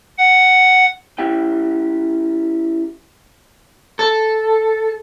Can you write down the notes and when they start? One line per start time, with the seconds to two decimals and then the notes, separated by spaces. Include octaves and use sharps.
0.18 F#5
1.18 C#4 E4 G4 G5
3.99 A4